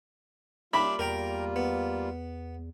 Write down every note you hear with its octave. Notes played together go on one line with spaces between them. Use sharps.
G3 A#3 D4 F4 G4 E5 B5
E2 A#4 G5 A#5
B3